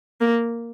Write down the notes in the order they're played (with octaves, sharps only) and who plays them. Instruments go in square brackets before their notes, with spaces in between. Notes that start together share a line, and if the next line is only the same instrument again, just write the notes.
[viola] A#3